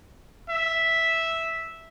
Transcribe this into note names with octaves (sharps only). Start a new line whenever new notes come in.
E5